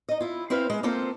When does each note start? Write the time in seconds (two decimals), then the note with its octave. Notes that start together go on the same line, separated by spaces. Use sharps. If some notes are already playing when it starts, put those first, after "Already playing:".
0.09 D#4 D#5
0.20 E4 F4
0.50 C4 E4 B4 C5 F5
0.70 G#3
0.83 A#3 C4 F4 A4 C5